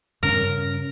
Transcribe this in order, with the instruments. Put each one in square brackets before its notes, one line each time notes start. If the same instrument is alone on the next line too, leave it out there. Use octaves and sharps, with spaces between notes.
[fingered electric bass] G2 C#3 C#4 [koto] A#4